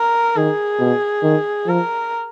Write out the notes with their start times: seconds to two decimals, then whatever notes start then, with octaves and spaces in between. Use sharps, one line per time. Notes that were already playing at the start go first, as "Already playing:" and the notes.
Already playing: A#4
0.36 D#3 G#4
0.79 B2
1.23 D#3
1.66 F3 A#4